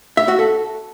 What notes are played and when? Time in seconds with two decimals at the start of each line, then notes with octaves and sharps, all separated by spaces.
0.17 E5
0.28 F#4
0.39 A4